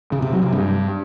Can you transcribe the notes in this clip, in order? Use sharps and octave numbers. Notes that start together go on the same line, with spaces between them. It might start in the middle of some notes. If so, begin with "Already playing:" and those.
C#3
C3
F#3
C3
G2